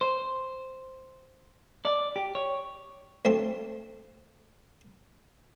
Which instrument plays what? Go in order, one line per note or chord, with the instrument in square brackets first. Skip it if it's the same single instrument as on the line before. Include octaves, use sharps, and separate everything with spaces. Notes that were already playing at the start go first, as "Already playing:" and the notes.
[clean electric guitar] C5
D5
G4
C#5
[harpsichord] D2 A3 C4 C6